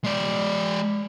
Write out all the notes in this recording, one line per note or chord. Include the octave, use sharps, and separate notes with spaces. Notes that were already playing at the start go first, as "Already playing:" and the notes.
G#3 D5